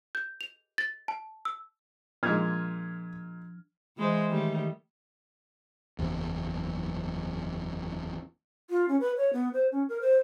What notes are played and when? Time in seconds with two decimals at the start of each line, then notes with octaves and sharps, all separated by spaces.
0.15 G6
0.41 F7
0.78 A6
1.08 A5
1.45 E6
2.23 A#2 F3 G#3 D4 F6 G#6
3.97 E3 G#3 C5
4.30 D#3 G3 A3
5.99 F#1 E2
8.70 F4
8.88 C#4
9.00 B4
9.17 C#5
9.33 B3
9.53 C5
9.72 C#4
9.89 A#4
10.01 C5